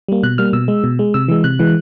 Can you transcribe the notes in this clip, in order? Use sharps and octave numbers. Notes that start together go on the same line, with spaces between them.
G3 A#3
B2 F#6
G3 A#3 F6
B2 E6
G#3
B2
G#3
C3 E6
E3 G#3
C3 F#6
E3 G#3